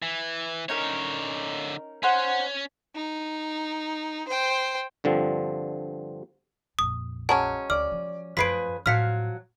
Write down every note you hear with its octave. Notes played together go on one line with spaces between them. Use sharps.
E3
D3 C#4 D#4 A#4 C#5
C#4 D#4 C5 F#5
D#4
C5 G5
G2 D3 F3 C4
A#1 F2 D#6
F#3 G#3 C#4 A5
D2 D5 F6
F3
F#2 F3 A3 G#4 B4 B6 C7 D7
A2 F3 F#3 F5 F6 B6 C#7